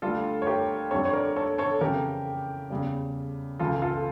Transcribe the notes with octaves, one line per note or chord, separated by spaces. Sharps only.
D2 D3 G3 F4 A4
C#5
G4 A#4
F2 D3 G3 A4 C#5
C#5
A#4 D5
A4 C#5
A4 C#5
F2 C#3 E3 G4 A#4
E2 C#3 G3
C#2 C#3 E3 F4 A4
F4 A4